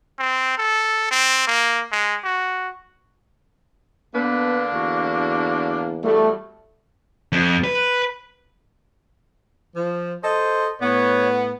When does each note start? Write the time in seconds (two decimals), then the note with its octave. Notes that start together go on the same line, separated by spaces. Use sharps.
0.19 C4
0.58 A4
1.11 C4
1.47 A#3
1.92 G#3
2.24 F#4
4.14 D3 A#3 B3 D4 B4
4.74 E2 F#4
6.04 F#3 G3 A3
7.32 F2
7.64 B4
9.76 F3
10.24 A4 C5 D#5
10.81 A2 B3 C#5